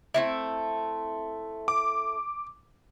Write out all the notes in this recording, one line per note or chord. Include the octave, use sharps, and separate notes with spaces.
A3 C4 E4
D6